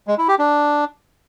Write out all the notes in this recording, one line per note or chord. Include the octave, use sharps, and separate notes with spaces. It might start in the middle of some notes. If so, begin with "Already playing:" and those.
G#3
E4
G4
D4